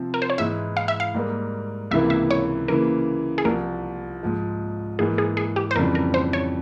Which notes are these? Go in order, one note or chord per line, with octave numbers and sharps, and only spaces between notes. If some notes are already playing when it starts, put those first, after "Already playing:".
Already playing: C3 F3 C4
A#4
C5
C#5
G#2 E3 G#3 E4 E5
F5
E5
F5
G#2 G3 A#3
C#2 C3 E3 A#3 E4 E5
E5
C#5
C#3 E3 A#3 A#4
G#4
C2 C3 F3 A#4
G#2 F3 G#3
G#2 E3 A#3 G#4
G#4
G#4
G4
C5
F2 C#3 E3 G3 C4 A#4
A#4
C5
C#5